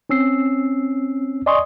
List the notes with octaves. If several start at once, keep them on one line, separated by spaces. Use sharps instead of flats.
C4 C#4 E6 C7
D5 D#5 G#5 C6 C#6 D#6